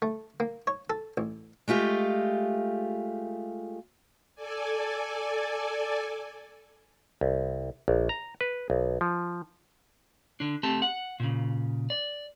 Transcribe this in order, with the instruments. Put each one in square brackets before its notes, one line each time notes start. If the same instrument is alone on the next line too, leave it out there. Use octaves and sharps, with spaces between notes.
[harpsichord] A3
A#3
C#5
A4
A1
[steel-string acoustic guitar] G#3 A3 F4 G4
[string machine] A4 D5 G#5
[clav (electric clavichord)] C2
A#1
A#5
B4
B1
F3
[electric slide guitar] D3 D4
A3 C4 G4 A5
F#5
A#2 C#3
D5